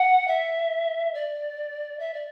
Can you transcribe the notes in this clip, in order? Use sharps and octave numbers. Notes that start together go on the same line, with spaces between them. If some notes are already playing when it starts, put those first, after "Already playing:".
Already playing: F#5
E5
D5
E5
D5